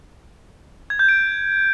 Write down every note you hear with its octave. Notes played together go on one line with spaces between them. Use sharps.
G#6
G6
D7